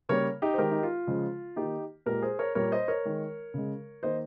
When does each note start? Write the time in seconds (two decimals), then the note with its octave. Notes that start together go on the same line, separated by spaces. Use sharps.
0.09 C#3 G3 A#3 A#4 C#5
0.42 D#4 G4
0.54 C5
0.58 D#3 G#3 G4 A#4
0.71 D#4
0.83 F4
1.07 C#3 F3 G#3
1.56 D#3 A#3 D#4 G4
2.06 A#2 G#3 G4 A#4
2.22 G#4 C5
2.39 A#4 C#5
2.55 A#2 G3 A#3 A#4 C#5
2.72 C5 D#5
2.88 A#4 C#5
3.05 D#3 G#3
3.54 C#3 G#3
4.03 D#3 A#3 C5 D#5